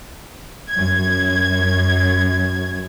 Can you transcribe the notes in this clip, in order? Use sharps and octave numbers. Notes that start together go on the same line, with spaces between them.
F#2 G#6